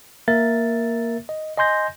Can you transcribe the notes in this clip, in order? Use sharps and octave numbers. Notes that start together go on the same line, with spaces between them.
A#3 A#4 E5 A6
D#5
D#5 G#5 C6 G6 A#6